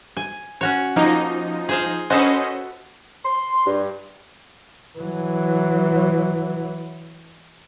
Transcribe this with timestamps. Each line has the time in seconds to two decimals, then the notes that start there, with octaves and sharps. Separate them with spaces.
0.17 G#5
0.61 C#4 F#4 C#5
0.96 F3 A#3 D#4
1.69 G#4 C5 F5
2.10 C#4 F#4 A4 B4 C5 D#5
3.24 C6
3.66 G2
4.99 E3 F#3